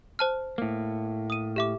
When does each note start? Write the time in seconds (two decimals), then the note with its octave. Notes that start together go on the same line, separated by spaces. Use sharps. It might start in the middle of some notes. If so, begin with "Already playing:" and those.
0.19 C5 A5 F6
0.58 A2 A#3
1.30 D#6 D#7
1.56 G4 E5 D6